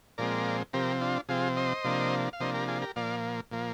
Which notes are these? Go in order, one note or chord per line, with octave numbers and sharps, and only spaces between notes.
A#2 F3 G#3 C4 A#4 D5
C3 F3 C4 G4 A#4
D4 F4
C3 F3 C4 F4 G#4
C5 D#5
C3 F3 A#3 D4
F5
C3 F3 A#3 D4 C5 D#5
G4 A#4
F4 G#4
G4 A#4
A#2 F3 A#3 D5 F5
A#2 F3 A#3